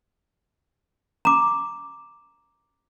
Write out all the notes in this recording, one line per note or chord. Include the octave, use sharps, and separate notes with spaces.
A#5 D6